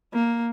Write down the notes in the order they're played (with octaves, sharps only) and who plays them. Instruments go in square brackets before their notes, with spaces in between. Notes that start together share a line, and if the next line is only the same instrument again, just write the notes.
[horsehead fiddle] A#3